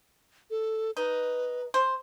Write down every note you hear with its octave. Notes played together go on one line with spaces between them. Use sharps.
A4
D#4 B4
C5